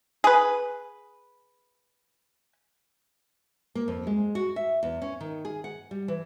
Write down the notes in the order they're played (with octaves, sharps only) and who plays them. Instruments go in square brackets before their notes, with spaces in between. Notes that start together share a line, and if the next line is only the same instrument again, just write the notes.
[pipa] G#4 B4
[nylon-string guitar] A#3
F2
G#3
F#4
E5
E2
C#4
D#3
G#4
F#5
G3
E3